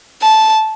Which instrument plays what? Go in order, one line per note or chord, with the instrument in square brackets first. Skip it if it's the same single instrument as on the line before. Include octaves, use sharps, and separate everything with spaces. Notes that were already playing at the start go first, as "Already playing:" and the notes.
[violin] A5